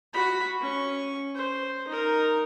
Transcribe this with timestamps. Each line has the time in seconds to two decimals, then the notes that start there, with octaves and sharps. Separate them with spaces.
0.13 F#4 B5
0.61 C#4 C#6
1.35 C5
1.88 D#4 A#4